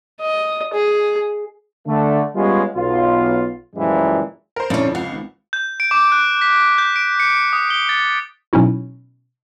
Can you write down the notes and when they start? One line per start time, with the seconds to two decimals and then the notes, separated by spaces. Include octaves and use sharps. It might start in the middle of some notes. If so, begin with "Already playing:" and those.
0.21 D#5
0.73 G#4
1.87 D3 A3
2.36 G3 G#3 B3 C#4 F4
2.75 B1 F4
3.75 F#2 A#2 E3 F3 G3 G#3
4.56 A#4 C5
4.70 F2 A#2 D3 F3 C#4 E4
4.95 C#2 F5 F#5
5.11 G#1
5.53 G6
5.80 D7
5.91 D6
6.12 F#6
6.42 B6
6.78 G6
6.96 D7
7.20 C#7
7.53 D#6
7.70 G7
7.89 A6
8.53 B2 F#3 C#4 D#4 E4 F#4